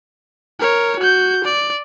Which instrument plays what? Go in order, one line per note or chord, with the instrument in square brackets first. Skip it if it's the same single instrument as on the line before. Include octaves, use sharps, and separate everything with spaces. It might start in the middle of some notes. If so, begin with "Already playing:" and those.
[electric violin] A#4 C#5
F#4 G6
D5